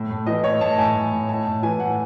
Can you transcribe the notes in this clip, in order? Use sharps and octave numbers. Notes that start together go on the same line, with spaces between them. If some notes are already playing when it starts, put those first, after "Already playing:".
Already playing: A2
A2
E3 D#5
A2 C#5
A2 A5
A2 G#5
A2
A2
A2 A5
A2
E3 G#5
A2 F#5